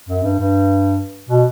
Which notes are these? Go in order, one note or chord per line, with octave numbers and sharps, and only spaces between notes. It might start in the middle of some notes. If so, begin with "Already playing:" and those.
F#2
G2
G2
B2